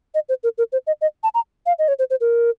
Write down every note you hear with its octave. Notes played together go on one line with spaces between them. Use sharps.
D#5
C5
A#4
A#4
C5
D#5
D#5
A5
A#5
F5
D#5
C#5
C5
C5
A#4